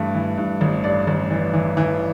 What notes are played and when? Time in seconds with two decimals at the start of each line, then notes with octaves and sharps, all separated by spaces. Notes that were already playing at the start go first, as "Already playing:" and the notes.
Already playing: G2 E3 A3
0.14 E3
0.38 G2
0.61 A1
0.84 G2 D5
1.07 A1
1.31 E3
1.53 E3
1.77 E3